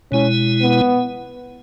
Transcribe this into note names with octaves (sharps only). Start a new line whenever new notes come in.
B2 G#3 C#4 E4
B3